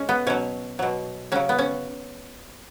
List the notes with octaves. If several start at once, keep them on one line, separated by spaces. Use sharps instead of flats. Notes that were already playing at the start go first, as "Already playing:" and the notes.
Already playing: G#3 C#4
B3
B2 F#3 C#4
B2 F#3
C#3 F#3 C#4
B3
C#4